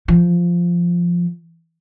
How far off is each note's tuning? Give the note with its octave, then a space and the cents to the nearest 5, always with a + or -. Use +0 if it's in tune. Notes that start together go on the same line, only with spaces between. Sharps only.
F3 -5